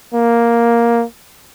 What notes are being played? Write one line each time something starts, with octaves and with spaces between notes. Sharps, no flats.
A#3